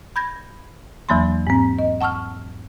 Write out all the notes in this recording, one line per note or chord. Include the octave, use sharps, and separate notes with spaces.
B5 G6 G#6 A#6
E2 E3 F#3 A#3 B5 C6
G#2 C4
D#5
F#5 A5 C#6 E6 F6